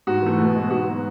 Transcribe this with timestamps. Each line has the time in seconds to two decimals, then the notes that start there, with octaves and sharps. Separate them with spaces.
0.07 G#2 F#4
0.22 E3 A3
0.38 B2
0.55 G#3 B3
0.70 G#2 F#4
0.86 F#3 B3